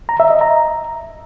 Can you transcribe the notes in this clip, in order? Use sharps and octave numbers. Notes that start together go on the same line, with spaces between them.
A#5
E5
D#5
A#5